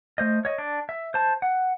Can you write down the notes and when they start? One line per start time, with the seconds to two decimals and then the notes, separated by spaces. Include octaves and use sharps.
0.18 A3 C5 D#5
0.45 C#5 D#5
0.58 D4
0.89 E5
1.14 C5 A5
1.42 F#5